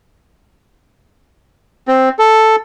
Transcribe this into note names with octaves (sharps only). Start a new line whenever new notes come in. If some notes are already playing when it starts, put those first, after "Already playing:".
C4
A4